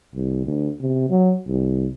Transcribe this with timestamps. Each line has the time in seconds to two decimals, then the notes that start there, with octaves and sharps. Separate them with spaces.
0.15 C2
0.46 D2
0.81 C3
1.10 F#3
1.47 C2